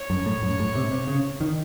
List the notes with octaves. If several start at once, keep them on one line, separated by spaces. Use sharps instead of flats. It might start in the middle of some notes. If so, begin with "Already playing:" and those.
Already playing: C#5
F#2
A2
F#2
A2
C3
C3
C#3
D#3